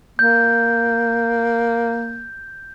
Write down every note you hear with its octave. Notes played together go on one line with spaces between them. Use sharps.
A#3 G6